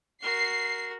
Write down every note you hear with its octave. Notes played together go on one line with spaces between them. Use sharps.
F#4 A#4 C7